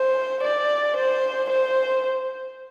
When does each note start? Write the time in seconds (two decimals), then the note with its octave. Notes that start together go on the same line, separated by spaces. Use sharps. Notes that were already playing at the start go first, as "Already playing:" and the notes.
Already playing: C5
0.43 D5
0.97 C5
1.50 C5